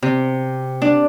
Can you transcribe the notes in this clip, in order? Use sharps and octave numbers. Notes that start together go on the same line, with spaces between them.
C3
D4